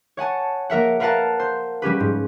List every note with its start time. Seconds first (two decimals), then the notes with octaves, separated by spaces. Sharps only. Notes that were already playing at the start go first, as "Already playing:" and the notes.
0.17 C#5 F#5 G#5 A5
0.70 A#3 A#4 E5 F#5
1.00 A#4 B4 F5 F#5 A5 A#5
1.39 C5
1.82 G3 C#4 G4 B4
2.00 G#2